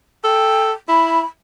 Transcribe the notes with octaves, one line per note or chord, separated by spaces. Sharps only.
A4 G5
E4 B5